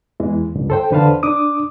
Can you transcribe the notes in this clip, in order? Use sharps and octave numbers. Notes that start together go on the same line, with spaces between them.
E2 E3 G#3
C#2 G2
A4 C5 G5
E2 D3 B4 C5 F5 A5
D4 D6 D#6